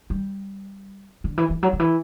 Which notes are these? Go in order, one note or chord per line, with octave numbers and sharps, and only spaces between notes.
G3
D3
E3
E3
F#3
D3
E3